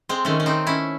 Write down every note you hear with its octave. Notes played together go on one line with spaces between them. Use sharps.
G#3 C4
D#3 A3 C#4
C#4
C4 D#4
C#4 E4